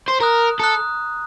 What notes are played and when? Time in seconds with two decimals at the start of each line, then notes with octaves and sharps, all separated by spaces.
0.08 C5
0.21 A#4 A#5 D#6 F#6
0.59 A4 A#5 D#6 F#6